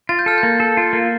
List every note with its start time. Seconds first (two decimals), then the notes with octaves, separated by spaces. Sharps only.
0.09 F4 A6
0.19 G6
0.26 A4 F6
0.38 G6
0.43 A#3
0.60 A4
0.77 F4
0.93 A#3